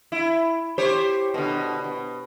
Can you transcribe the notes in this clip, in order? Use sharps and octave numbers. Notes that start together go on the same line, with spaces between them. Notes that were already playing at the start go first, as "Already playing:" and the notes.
E4
G4 C5 C#5
B2 D3
B2